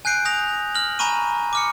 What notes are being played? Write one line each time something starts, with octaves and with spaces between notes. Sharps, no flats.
G#5 F#6 G6 C7 D7
G#5 D#6 G6 A#6 F7
F6 A#6 F#7
G#5 A#5 B5 C#6 D#7
D6 F6 C#7